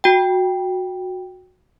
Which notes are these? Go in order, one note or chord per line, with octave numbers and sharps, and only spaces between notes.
F#4 G5